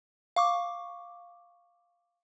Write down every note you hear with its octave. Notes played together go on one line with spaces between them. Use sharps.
F5 C#6 D6